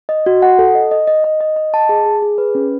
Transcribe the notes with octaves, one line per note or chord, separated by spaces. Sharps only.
D#5
F#4
F#5
A4
D#5
D#5
D#5
D#5
D#5
D#5
A5
G#4
G#4
G#4
B4
C#4